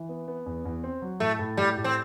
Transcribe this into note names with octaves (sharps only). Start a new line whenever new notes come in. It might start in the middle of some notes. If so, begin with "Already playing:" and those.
Already playing: E3
B3
B3
E2
E2
C4
F#3
A2 A3
A2
A2 G3
A2
C4